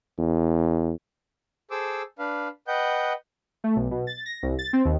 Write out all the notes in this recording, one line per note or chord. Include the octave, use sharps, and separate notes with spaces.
E2
G#4 A4 C5 D6 E6
D4 B4 F5
B4 D#5 F#5 G5 G6
A3
B1
B2
A6
A#6
C2
A6
C4
D#2